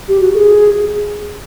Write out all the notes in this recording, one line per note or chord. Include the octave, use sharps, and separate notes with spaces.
G4
F#4
A4
G#4